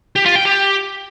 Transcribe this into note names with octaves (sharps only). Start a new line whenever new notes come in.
G4
F4
G5
G4